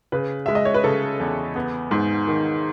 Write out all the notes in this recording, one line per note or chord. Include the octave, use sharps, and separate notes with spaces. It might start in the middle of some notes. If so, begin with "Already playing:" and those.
C#3 B4
G#3 E5
D#5
C#5
B4
C#3 A4
E2
B3
G#2
D#3